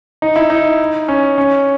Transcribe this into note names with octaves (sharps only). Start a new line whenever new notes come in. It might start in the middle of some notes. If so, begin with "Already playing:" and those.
D#4
E4
D#4
C#4
C#4